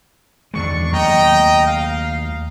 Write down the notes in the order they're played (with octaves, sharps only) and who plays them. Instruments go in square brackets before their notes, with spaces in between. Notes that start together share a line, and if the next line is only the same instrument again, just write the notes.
[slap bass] E2 D#3 G#3 [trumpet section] D4 C#6
[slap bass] D#2 F#3 A3 [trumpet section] D#5 G5 A#5
[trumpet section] F5